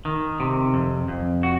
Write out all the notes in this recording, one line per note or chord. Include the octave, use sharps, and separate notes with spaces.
D#3
C3
F2
F2
F#4